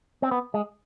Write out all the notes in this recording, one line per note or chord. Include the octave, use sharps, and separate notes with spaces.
C4
B3
G#3